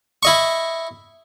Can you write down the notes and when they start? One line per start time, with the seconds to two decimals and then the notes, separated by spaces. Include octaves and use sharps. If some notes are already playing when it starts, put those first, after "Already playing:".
0.23 E4 D#5 C#6